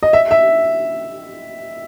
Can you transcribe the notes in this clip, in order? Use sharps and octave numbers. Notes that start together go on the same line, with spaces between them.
D#5
E5
E5